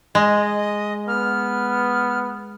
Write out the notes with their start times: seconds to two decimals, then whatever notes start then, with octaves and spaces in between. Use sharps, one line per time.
0.15 G#3 D#5
1.08 B3 F6